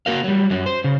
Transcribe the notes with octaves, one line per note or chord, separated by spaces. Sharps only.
A#3 F#4 A#4 F5
F#3 G3
F#2 F#3
C5
C#3